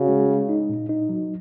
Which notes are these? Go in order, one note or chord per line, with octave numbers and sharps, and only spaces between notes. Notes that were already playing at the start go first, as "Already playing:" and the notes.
Already playing: C#3 F#4
G#3
G#3
D#4
A#2
D#4
F#3